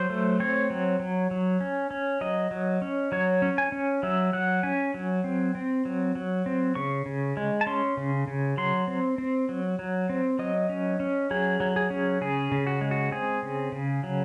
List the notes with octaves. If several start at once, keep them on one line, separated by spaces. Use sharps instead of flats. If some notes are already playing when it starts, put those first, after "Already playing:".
Already playing: F#3 C5
A3
C4 C#5
F#3
F#3
F#3
C#4
C#4
F#3 D#5
F#3
C#4
F#3 C#5
C#4
G#5
C#4
F#3 E5
F#3 F#5
C#4 G#5
F#3
C4
C4
F#3
F#3
C4
C#3 C#6
C#3
G#3
A5
C#4 C6
C#3
C#3
F#3 C6
C4
C4
F#3
F#3
C4
F#3 D#5
C#4
C#4
F#3 G#4
F#3
G#4
C#4
C#3 G#4
C#3
F#4
G#3
F#4
C4 G#4
C#3
C#3
F#3